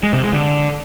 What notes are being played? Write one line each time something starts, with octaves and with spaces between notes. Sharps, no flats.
G#3
C3
G#3
D3